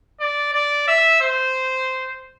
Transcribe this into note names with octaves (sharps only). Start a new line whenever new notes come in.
D5
D5
E5
C5